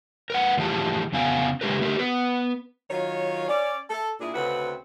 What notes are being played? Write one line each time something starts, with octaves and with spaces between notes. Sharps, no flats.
A#4 B4 F#5
A2 E3 F3 G4 G#4 A5
F2 C#3 B3 F5 G#5
C#3 G#3 B3 G4 A#4 B4
A3 G4 G#4 A#4
B3 B4
D#3 F#3 F4 C#5
C#4 D5
A4
A#2 D4 E4 G#4
D2 C#3 C4 F#4 B4